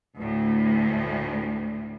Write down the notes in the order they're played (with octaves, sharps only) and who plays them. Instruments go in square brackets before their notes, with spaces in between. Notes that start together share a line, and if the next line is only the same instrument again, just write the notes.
[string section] D2 A2